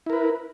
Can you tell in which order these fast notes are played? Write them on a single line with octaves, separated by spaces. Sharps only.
E4 A#4 B4